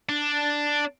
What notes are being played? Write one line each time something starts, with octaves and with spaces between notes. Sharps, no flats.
D4